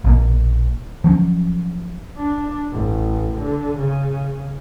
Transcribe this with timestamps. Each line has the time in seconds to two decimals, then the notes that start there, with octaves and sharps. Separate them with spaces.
0.04 A#1 B2 A#3
1.04 F3 F#3 C4 C#4
2.17 D4
2.72 A1
3.38 D3
3.78 C#3